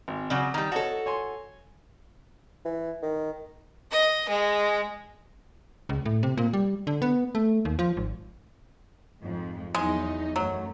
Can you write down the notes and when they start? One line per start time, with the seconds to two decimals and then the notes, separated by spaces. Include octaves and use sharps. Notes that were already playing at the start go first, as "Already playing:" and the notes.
0.08 G#1
0.30 C#3 F#3 D5 F#5
0.54 D#3 G3 A#5
0.72 F#4 A4 C#5 D#5 A5
1.06 C#5 G#5 C6
2.65 E3
3.02 D#3
3.91 D#5
4.29 G#3
5.89 C#2
6.05 A2
6.23 C3
6.37 A#2
6.53 G3
6.87 D3
7.02 B3
7.35 A3
7.65 D#2
7.79 F3
7.97 G#1
9.21 F2 G#2
9.74 E2 F#3 G#3 D#4
10.36 F#2 F#3 A3